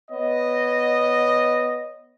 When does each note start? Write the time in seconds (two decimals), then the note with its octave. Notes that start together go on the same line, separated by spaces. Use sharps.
0.11 B3 C#5 D#5